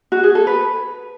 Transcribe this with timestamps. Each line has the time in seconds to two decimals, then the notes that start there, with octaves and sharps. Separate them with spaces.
0.12 F#4
0.23 G#4
0.35 A4
0.47 B4